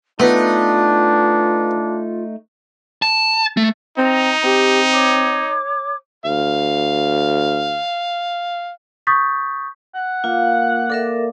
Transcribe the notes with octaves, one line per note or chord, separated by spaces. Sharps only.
A3 B3 D4 D#4 F4
A5
A3
C4 D#4 A#5
C4 G4
C#5 D6
D2 F5
C#6 D#6 G6 A6 B6
F#5
A#3 F4
A4 A#4 D5 E5